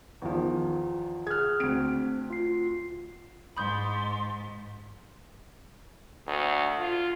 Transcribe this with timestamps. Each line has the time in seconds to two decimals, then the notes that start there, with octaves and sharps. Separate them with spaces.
0.22 E2 D#3 F3
1.27 G#4 F6 F#6 G#6
1.60 D2 C4 D7
2.30 F4 C7
3.57 G#2 B5 C6 D#6 G6
6.27 D2
6.79 F4